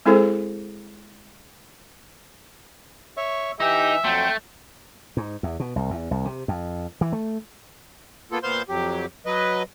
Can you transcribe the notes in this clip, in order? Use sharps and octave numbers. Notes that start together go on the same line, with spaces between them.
G#3 C4 E4 G#4 A4 C5
C#5 E5 C#6
E3 D#4 G4 E5
F2 F#3 A3 G5 C6
G#2
E2
B2
C2
E2
C2
C3
F2
E3
A3
A#3 B3 F4 A4
A#2 B3 C5 F5 C6 G6
F2 F#3 G4
F#3 B4 D#5